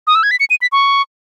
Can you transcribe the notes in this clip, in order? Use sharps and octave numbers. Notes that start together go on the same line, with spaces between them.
D#6
E6
G#6
B6
C#7
D#7
B6
C#6